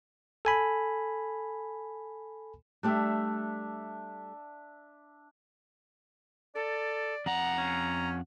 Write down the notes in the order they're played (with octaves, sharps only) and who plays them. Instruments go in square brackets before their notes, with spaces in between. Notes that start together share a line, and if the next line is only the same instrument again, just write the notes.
[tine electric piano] A4 G#5 B5
[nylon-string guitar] G3 A3 G4 [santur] D4 E5
[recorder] A4 [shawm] D5
[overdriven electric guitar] F2 F#5 [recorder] A#5
[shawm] C#4